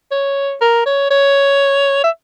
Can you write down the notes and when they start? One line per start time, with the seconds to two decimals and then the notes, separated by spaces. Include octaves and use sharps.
0.11 C#5
0.61 A#4
0.86 C#5
1.11 C#5
2.04 E5